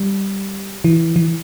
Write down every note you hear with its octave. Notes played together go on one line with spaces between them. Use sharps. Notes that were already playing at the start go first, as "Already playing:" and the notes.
Already playing: G3
E3
E3